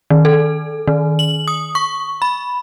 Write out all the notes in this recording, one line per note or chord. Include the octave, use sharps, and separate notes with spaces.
D#3
A4
D#3
F#7
D#6
C#6
B5